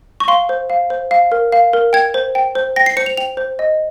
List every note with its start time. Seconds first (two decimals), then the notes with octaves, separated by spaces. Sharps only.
0.20 C#6
0.28 F5 C6
0.49 C5
0.70 F5
0.90 C5
1.11 F5
1.32 A#4
1.52 F5
1.73 A#4
1.93 G5 G#6
2.14 C5
2.35 G5
2.55 C5
2.76 G5 A#6
2.86 C7
2.97 C5 C#7
3.06 F7
3.17 G5 F7
3.37 C5
3.59 D#5